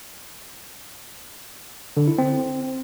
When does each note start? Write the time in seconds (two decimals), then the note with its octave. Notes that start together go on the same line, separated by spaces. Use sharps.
1.97 D3
2.08 E4
2.18 C4